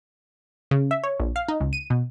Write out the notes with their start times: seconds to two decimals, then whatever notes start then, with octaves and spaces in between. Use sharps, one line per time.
0.71 C#3
0.91 E5
1.04 C#5
1.20 A#1
1.36 F5
1.48 D#4
1.61 C#2
1.73 D#7
1.90 B2